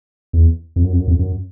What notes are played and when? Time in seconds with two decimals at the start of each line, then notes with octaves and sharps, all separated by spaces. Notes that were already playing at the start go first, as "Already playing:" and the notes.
0.33 E2
0.76 F2
0.84 F#2
0.92 F2
0.99 F#2
1.08 F2
1.19 F#2